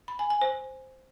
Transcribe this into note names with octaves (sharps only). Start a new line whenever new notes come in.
B5
G#5
G#5
C5